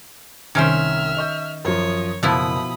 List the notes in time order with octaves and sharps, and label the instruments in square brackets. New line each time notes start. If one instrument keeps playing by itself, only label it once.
[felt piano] C2 G#6 [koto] D#3 C#4 C5 [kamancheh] E5 F6
[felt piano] D#5 C#6 G6
[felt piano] F#2 F3 [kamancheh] C#5 D#6
[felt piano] F#1 [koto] B2 F3 E4 [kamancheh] B5 D#6